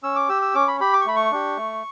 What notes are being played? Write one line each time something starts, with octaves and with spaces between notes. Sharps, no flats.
C#4 E6
D6
G4 E6
E6
C#4 D6
B5
G4 B5
D6
C#6
A3 B5
C#6
D4 G4
A3